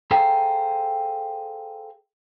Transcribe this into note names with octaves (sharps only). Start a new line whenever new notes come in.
G#4 A4 C5 F5 G5 A#5